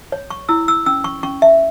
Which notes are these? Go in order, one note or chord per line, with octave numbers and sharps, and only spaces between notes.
C#5
C#6
E4 E6
E6
C#4 E6
C#6
C#4 C#6
E5